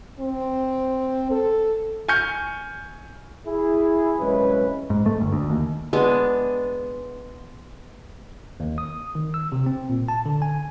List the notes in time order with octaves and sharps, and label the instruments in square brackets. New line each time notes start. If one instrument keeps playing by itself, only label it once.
[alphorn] C4
A4
[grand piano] G#5 C#6 F6 G6 C#7
[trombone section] E4 G#4
C2 F#2 E3 G#3 C#4 B4
[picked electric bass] G#2
A3
G1
D2
D#2
[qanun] G#3 B3 D4
[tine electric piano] D#2
D#6
D#3
E6
C3
C4
A#2
A5
D3
G#5